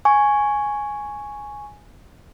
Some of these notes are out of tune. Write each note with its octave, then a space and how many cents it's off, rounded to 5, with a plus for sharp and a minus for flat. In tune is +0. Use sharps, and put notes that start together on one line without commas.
G#5 +0 C#6 +0